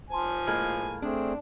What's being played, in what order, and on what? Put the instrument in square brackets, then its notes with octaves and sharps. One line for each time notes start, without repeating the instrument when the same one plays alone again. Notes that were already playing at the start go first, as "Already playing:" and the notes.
[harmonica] F3 G#5 [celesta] C5 A5 C6
[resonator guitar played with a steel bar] A2 G#3 A#3 [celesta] A4 F6 G#6
[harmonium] A3 C4 G#4 [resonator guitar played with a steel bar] D4